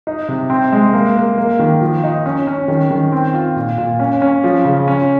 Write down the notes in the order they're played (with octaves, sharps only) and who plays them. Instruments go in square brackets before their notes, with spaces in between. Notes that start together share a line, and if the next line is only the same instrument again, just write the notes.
[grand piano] D#4
C3
C4
G#3
A#3
A#3
A#3
D#3
F3
D#4
C#4
C#4
D#3
D#3
C4
F4
A#2
A#2
C#4
C#4
F3
C#3
C#4